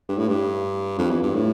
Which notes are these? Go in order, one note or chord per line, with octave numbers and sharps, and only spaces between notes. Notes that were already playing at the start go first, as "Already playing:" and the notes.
G2
A2
G2
F2
E2
G2
A2